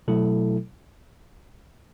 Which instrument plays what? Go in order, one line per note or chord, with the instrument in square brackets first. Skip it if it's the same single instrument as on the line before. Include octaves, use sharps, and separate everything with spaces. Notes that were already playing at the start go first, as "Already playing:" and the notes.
[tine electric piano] B2 F#3 A3 E4 A4